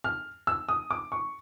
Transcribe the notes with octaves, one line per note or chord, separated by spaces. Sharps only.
F6
E6
D#6
D6
C#6